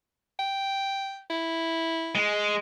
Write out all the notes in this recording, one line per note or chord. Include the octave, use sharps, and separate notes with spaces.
G5
E4
G#3